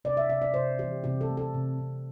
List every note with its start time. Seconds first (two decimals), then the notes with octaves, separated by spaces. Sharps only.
0.05 C3 D5
0.17 E5
0.29 C3 E5
0.42 D5
0.54 C3 C5
0.79 E3 G4
1.04 C3 G4
1.21 A4
1.30 A3
1.37 A4
1.54 C3
1.79 C3